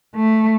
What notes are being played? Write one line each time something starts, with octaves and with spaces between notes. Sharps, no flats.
A3